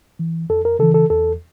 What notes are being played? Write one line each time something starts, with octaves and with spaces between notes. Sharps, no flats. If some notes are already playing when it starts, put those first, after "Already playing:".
E3
F2 A4
A#4
C#3 E3 A4
A4
E2 A4